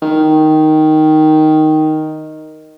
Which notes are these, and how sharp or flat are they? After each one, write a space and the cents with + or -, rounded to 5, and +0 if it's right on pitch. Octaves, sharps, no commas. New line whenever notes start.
D#3 +0